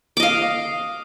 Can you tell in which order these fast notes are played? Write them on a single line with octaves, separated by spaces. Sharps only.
D6 D#5 F5